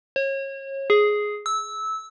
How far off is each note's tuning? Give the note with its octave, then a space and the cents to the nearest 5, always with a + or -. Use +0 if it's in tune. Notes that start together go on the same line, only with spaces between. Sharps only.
C#5 -30
G#4 +5
E6 -15